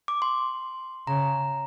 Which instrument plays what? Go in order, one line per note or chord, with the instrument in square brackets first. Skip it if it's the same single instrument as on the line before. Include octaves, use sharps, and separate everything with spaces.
[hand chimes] D6
C6
[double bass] C#3 [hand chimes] A#5